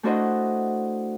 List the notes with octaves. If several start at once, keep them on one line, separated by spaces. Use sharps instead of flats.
A3 D4 E4 F#4 C5 D#5